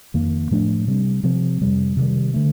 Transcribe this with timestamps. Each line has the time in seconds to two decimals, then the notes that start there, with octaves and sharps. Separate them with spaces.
0.14 F2 D#3 A#3
0.51 A2 F3 A3 D4
0.87 C3 G3 C4
1.24 C3 F3 C4
1.61 F2 C3 G3
1.97 C3 D#3 G3
2.34 D3 A3